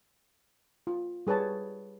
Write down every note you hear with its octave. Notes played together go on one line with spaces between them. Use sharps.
F4
G3 G#4 B4 C#5 A5